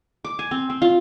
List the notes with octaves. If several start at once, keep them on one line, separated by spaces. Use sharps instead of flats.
D6
G#5
C4
C4
F4